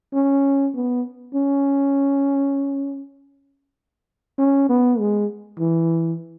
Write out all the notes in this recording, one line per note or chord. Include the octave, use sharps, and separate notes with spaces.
C#4
B3
C#4
C#4
B3
G#3
E3